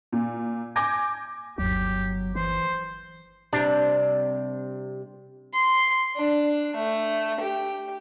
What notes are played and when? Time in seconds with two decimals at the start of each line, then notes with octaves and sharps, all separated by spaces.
0.13 A#2
0.76 G#5 D6 G6 G#6 A#6
1.58 G1 D#2 F#3 G4
2.35 E3 C5
3.53 C3 G3 D4
5.54 C6
6.16 D4
6.75 A3
7.41 G4